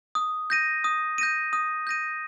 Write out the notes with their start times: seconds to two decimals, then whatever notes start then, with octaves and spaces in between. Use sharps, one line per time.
0.15 D#6
0.50 G6 A#6 D#7
0.84 D#6
1.18 G6 A#6 D#7
1.53 D#6
1.87 G6 A#6 D#7